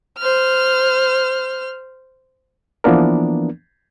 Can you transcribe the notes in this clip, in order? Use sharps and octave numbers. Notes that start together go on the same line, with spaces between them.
C5 F6
E3 F3 A#3 B3 D4 A#4